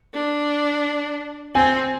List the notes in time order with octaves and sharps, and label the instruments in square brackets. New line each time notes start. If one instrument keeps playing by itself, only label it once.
[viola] D4
[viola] C4 [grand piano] G#5